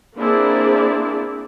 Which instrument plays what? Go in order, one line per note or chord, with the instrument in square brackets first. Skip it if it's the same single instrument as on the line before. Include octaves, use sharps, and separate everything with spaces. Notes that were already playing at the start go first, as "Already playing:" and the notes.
[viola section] A#3 C4 D4 E4 G#4 D5